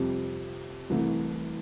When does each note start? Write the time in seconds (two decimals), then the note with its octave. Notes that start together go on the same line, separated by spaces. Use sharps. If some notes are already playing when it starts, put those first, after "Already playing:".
Already playing: F2 C3 G3
0.90 C2 C3 E3 A3